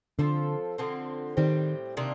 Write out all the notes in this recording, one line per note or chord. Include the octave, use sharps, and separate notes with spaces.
D3 F3 C4 F4 A4
D3 F3 C4
A2 D#3 G3 C4 G4
C3 D#3 A#3 D4